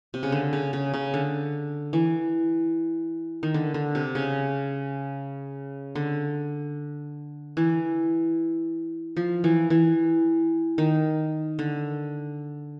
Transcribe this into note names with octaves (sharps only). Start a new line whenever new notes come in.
C3
C#3
D3
C#3
C#3
C#3
D3
E3
D#3
D3
D3
C3
C#3
D3
E3
F3
E3
E3
D#3
D3